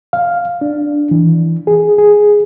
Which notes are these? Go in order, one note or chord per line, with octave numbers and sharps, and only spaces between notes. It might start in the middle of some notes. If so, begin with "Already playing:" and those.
F5
D4
E3
G#4
G#4